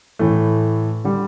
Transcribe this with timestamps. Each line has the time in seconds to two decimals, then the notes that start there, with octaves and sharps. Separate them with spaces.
0.19 A2 E3 A3
1.04 D3 G3